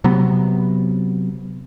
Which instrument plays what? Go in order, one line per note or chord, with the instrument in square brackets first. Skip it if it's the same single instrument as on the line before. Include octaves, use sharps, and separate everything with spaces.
[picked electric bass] C3 F#3 B3